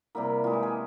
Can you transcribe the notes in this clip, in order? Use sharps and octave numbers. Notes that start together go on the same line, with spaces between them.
C3 G3 A#3 E4
E3 G#3 F4
G4
G#4